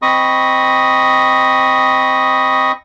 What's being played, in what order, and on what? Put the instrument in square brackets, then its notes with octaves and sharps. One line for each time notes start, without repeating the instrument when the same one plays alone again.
[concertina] C4 D#5 B5 C#6 D#6